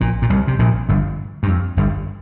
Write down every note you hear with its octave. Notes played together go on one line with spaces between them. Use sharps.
A#1 A#2
A#2
C2 C3
C3
A#1 A#2
G1 G2
G2
F2
G1 G2